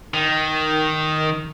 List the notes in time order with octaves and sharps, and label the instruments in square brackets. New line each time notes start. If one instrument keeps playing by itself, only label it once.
[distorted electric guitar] D#3